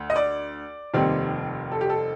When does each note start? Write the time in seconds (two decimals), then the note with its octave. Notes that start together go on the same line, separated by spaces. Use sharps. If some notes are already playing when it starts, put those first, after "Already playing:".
Already playing: D2
0.10 D#5
0.16 D5
0.94 F1 D#2 D#3 G3 C4
1.72 A4
1.81 G4
1.90 A4